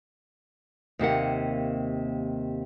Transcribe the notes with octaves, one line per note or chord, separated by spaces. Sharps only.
D#2 C3 A#3 F#5